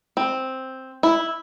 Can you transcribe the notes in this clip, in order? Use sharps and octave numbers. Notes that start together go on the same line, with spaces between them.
C4
E4